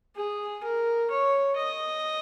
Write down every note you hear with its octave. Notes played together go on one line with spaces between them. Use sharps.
G#4
A#4
C#5
D#5